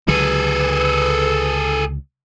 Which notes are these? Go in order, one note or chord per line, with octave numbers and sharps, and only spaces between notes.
C#2 D3 F#3 G#4 A4 B4